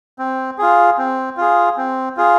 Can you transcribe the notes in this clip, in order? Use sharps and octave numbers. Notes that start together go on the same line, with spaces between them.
C4
F4 G#4
C4
F4 G#4
C4
F4 G#4